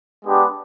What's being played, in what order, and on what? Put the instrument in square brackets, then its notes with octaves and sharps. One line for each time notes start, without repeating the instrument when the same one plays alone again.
[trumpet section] G#3 B3 D4 G4